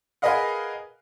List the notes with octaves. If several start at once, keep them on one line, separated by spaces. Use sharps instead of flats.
G#4 A#4 B4 D#5 F5 F#5